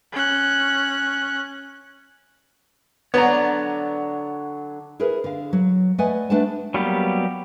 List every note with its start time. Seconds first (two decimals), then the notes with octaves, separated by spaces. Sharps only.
0.13 C#4 F#6
3.14 D3 F#3 B3 D4 C#5 D5 A#5
5.00 E4 G#4 A#4 B4
5.24 D3 F5
5.53 F#3
5.98 A3 B4 D5 D#5 F#5 G#5
6.30 A3 D4 B4 F#5 A5
6.74 F#3 G3 A#3 B3 G4